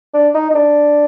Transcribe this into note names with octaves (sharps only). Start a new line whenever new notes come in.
D4
D#4
D#4
D4